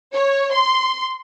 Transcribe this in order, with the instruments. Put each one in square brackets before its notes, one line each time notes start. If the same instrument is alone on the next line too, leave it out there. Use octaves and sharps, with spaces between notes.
[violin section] C#5
C6